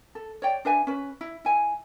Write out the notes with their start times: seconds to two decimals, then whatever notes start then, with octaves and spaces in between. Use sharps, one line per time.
0.15 A4
0.42 C#5 D5 G5
0.65 D4 B4 E5 G#5
0.87 C#4 B4
1.21 E4
1.45 E4 G#5